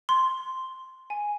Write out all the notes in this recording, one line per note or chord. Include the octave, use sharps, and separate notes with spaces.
C6
G#5